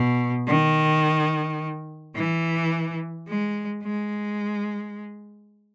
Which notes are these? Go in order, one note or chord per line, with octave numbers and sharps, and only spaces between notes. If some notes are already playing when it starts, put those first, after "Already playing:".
Already playing: B2
D#3
E3
G#3
G#3